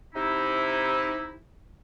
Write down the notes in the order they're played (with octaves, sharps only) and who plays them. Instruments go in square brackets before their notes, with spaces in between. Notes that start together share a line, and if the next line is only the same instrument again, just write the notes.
[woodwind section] C3 D#4 E4